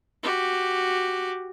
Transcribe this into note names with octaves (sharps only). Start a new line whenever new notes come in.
F#4 G4